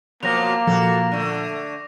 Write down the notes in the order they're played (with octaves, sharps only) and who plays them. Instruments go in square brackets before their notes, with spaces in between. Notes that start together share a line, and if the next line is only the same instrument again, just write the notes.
[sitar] B2 F3 F#3 [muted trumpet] A#3 [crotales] D6 A#6 F7
[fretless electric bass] A#2 F3 [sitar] F#4 A4
[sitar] D3 A3